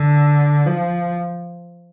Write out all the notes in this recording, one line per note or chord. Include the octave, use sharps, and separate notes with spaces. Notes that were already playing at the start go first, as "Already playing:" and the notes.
Already playing: D3
F3